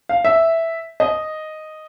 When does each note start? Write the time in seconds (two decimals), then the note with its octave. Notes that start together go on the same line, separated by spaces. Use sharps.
0.09 F5
0.25 E5
1.00 D#5